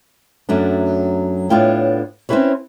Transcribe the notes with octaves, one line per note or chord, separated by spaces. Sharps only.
F#2 F#3 A3 D4
A2 B3 D4 F4 C#5 G5
C4 C#4 E4 G4 B4 C#5